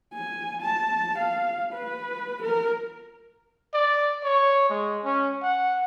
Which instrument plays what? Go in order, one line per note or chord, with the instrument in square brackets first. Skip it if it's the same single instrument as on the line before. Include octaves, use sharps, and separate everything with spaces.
[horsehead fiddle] G#5
A5
F5
B4
A#4
[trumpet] D5
C#5
G#3
C#4
F#5